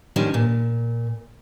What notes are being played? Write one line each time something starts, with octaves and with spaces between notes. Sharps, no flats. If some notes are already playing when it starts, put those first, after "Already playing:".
D#3 F3 G3 C#4 D4
A#2